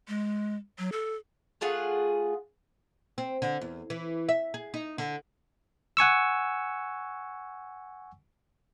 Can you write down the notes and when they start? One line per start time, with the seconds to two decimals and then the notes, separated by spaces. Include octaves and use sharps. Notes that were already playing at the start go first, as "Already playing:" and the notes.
0.08 G#3
0.79 F#3
0.92 A4
1.61 A3 F4 G#4 F#5
3.18 C4
3.42 D3
3.61 E2
3.90 E3
4.29 E5
4.54 G#4
4.74 D#4
4.98 D3
5.97 F#5 G#5 C#6 E6